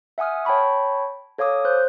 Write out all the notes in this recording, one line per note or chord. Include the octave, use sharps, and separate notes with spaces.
E5 F#5 G#5 D#6 F6
C#5 G5 A5 B5 C#6
A4 C#5 F5 D6 D#6
C5 F#6 G6